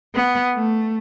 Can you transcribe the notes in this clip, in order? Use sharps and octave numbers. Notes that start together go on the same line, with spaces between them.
B3
A3